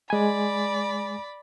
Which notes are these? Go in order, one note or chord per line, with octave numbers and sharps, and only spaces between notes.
G#3 D5 G#5 B5